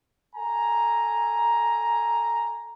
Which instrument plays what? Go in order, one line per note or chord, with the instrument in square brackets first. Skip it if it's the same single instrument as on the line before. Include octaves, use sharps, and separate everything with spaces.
[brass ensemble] A4 G#5 A#5